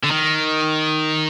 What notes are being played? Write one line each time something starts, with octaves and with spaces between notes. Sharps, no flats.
D3
D#3